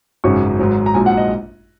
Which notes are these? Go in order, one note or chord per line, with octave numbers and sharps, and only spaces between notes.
G#1 F#2 C#3 F#3 C#6
G#1 G#2 F#3
A#5
A#1 G#2 F#3 G#5
F#5
D#5